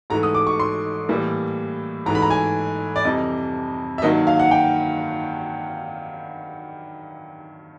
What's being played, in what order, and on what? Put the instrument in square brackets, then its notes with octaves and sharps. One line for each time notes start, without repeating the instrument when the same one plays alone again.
[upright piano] G#2 E3 A3 A#5
D#6
D6
C#6
C6
A2 E3 G3 A#3
G#2 E3 A3 A#5
B5
A#5
G#5
D5
F2 C3 E3 G3 D#5
E5
G2 D#3 F#3 A#3 D#5
F5
F#5
G5